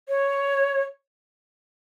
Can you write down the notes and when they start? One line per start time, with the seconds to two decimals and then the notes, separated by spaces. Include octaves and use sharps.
0.09 C#5